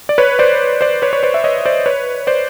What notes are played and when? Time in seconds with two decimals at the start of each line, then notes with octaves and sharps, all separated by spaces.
0.09 D5
0.18 B4 C#5
0.39 C5 D5
0.81 C5 D5
1.02 B4 C#5
1.13 C#5
1.23 C5 D5
1.34 E5
1.44 C#5 D#5
1.66 C5 D5
1.86 B4 C#5
2.27 C5 D5